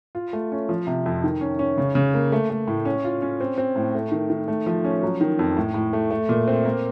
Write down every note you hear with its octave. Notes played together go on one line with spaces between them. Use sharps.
F4
A3
C#4
F3
C3
F2
D#3
C#4
C#4
C#3
C#3
A#3
A3
A3
A2
C#4
F4
C#4
C4
C4
A2
A3
D#3
D#3
A3
F3
C#4
F#3
D#3
F2
A2
A2
A3
A3
A#2
C4
A#3